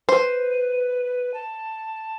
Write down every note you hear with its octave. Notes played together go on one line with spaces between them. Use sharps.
B4 C5
A5